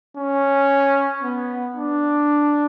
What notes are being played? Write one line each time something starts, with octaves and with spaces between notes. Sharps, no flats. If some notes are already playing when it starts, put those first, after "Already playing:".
C#4
B3
D4